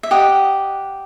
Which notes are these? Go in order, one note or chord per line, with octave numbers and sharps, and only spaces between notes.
E5
G4 D#5 F#5